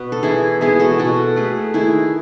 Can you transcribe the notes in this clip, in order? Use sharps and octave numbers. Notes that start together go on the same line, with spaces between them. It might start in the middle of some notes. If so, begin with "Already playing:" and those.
Already playing: B2 B3 F#4 B4
A4
E3 E4 G#4
G#3 B3 E4 G#4
F#4 A4
B2 F#4 A4
A3 G#4 B4
D#3 E4 G#4